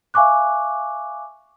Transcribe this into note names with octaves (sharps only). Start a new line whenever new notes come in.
E5 F5 G#5 C#6 D6 F#6